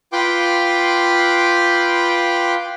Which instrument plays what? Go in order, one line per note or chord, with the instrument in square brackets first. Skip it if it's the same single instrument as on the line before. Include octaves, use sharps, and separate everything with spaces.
[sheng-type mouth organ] F4 B4 G5 C6 D6